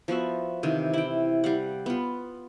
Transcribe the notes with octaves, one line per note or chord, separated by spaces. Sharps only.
F3 B3 F#4 E5
C3 D#3 E3
E4 G5
G3 F5 F#5
B3 F4